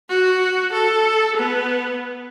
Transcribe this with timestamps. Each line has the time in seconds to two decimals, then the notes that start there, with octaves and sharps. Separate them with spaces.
0.09 F#4
0.72 A4
1.37 B3